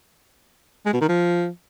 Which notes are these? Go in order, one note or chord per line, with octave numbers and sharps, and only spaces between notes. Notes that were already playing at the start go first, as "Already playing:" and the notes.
G#3
B2
D#3
F3